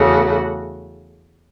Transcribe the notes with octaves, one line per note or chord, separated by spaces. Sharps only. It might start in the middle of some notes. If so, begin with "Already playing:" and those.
Already playing: E2 C#3 A3 F#4